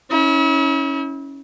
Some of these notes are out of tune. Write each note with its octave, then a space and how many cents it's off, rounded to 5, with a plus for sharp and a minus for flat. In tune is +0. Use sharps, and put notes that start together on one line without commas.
C#4 +0 E4 -40